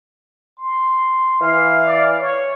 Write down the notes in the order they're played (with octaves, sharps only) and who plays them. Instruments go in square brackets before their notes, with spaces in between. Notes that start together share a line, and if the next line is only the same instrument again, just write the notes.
[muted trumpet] C6
[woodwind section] E3 F5
[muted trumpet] D5
C#5